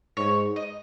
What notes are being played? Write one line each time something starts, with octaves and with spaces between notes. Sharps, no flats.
G#2 C#5
D#5